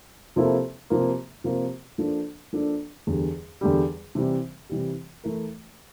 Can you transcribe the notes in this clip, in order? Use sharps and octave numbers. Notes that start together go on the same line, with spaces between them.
C3 F3 A#3 E4 A4
C3 F3 A#3
C3 F3 A#3
F3 A#3 D4 A4
F3 A#3 D4 A4
E2 D3 G3
E2 D3 G3
C3 E3 G3
C3 E3 G3
E3 A3 E4 A#4